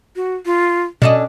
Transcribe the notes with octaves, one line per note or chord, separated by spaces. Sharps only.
F#4
F4
B2 C#4 D4 A4 D#5